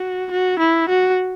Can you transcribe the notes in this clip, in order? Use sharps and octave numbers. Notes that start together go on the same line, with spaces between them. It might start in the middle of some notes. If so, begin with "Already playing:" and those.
Already playing: F#4
F#4
E4
F#4